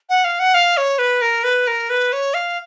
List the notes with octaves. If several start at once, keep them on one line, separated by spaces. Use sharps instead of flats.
F#5
F5
F#5
F5
C#5
B4
A#4
B4
A#4
B4
C#5
F5